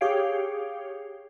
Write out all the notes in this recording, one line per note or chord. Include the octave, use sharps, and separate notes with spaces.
G4 G#4 C#5 F5 G5